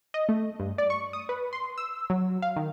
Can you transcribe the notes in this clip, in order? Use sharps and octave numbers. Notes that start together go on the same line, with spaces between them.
D#5
A3
G2
D5
C#6
D#6
B4
C6
E6
F#3
F5
D#3